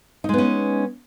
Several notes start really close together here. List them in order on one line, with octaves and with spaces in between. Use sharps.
D#4 G#3 B3 C#4